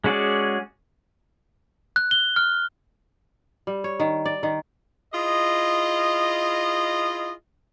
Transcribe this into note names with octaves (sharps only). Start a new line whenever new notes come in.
G#3 C#4 F#4 G#4 D5
F#6
G7
F6
G3
C#5
D#3
D5
D#3
E4 F4 G#4 D#5